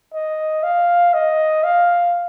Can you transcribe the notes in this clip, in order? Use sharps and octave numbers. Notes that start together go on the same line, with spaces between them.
D#5
F5
D#5
F5